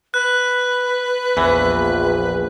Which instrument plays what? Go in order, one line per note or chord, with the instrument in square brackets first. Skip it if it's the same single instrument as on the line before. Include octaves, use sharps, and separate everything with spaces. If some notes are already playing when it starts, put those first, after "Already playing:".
[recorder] B4 [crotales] F#6
[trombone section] A#1 [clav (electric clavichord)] E2 E3